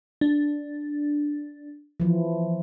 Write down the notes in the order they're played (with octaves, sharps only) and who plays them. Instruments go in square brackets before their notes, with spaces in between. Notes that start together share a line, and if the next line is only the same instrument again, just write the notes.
[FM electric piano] D4
[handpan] E3 F3